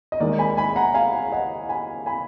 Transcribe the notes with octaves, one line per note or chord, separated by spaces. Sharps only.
D#5
D#2 D#3 G#3 A#4 D5
G#5 B5
G#5 B5
F#5 A#5
F5 G#5
D#5 F#5
G#5 B5
G#5 B5